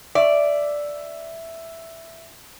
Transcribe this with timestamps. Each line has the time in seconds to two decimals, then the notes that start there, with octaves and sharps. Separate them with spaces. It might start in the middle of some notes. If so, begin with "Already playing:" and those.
0.15 D5 E5